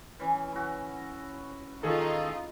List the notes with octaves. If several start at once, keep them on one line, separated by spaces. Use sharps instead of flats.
E3 C#4
E4 F#4
D#3 D#4 F4 G#4 A4 D#5